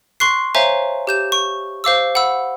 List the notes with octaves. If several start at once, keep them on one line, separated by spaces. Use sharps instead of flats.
C6 C#6 F#6 C7
C5 C#5 E5 F5 G#5 A#5
G4 G6 E7
C#6
C5 F5 D6 E6
F#5 B5 E6